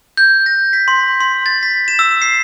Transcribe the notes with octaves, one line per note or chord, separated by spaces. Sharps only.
G6
A#6
B6
C6
C6
A6
B6
E7
E6
C7